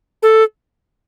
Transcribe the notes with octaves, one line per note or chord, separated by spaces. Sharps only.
A4